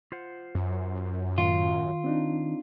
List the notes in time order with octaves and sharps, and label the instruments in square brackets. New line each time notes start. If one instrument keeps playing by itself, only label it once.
[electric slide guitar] F4 C5 F#5
[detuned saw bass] F#2
[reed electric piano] A2 [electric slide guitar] D#3 [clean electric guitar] F4
[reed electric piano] C4 D4 D#4